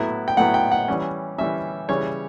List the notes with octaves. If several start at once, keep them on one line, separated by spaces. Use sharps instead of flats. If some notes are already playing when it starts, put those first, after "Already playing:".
Already playing: A2 F#3 B3 E4
G5
A2 F#3 B3 E4 F#5
G5
F#5
E3 G3 C#4
E3 G3 C#4 E5
C#3 E3 G3 C#4 C#5